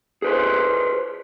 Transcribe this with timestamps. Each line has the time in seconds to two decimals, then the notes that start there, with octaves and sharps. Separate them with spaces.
0.22 G#4 B4 C5